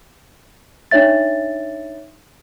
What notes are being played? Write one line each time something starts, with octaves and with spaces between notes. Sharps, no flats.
D4 D#4 C#5 E5 A6